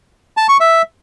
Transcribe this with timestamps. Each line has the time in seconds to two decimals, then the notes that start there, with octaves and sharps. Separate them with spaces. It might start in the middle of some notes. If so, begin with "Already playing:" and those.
0.37 A5
0.49 C#6
0.60 E5